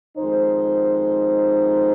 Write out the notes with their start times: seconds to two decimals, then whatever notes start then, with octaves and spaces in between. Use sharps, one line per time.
0.17 F2 D#3 G#3 D#4 C5